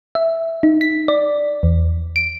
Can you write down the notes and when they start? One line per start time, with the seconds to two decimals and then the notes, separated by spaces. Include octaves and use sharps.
0.15 E5
0.63 D#4
0.81 B6
1.08 D5
1.63 E2
2.16 D7